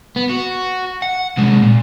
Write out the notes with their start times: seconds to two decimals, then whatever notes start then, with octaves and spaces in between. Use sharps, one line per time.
0.16 B3
0.29 F#4
1.02 F#5
1.37 C3 G#3
1.62 A#2